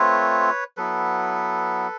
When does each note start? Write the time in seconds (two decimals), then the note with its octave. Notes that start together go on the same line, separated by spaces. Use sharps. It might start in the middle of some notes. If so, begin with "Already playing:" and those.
Already playing: A3 C4 F4 B4 C#5
0.77 F#3 B3 E4 A4 B4